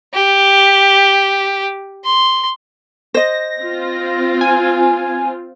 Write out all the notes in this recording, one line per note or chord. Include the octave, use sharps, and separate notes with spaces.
G4
C6
C5 D#5 A#6
C4 F4
G#5